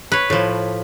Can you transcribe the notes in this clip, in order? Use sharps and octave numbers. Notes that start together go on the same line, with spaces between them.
B4 C#5
A2 F3